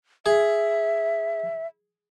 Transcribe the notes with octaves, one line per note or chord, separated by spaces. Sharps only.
G#4 E5